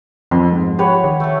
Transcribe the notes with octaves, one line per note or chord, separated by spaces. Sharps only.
F2 F3 C6
G#2
G4 B4 C#5 F#5
D#3
A3 A4